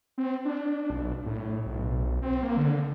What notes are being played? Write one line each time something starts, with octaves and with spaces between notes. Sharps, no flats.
C4
D4
B1
A2
B1
C4
A#3
D3